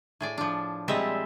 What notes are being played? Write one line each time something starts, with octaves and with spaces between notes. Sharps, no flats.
A2 G#4 D5
F3 D4
A#2 G3 G#3 C4 D#5 E5